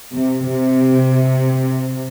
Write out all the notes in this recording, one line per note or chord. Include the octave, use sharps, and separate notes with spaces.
C3
C3